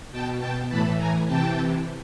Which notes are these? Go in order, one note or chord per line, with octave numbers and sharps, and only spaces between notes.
B2 G5 A5
G5 A5
A2 E3 A5 B5
G#5 A#5
C3 E3 G5 A5